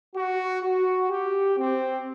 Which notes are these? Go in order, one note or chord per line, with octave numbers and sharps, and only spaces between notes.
F#4
F#4
G4
C4